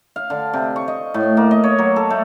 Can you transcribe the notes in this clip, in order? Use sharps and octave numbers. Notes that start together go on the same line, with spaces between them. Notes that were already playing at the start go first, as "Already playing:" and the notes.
F5
D3
C3
C#6
D#5
A2
A#3
D#5
C#5
F#3
A4
A3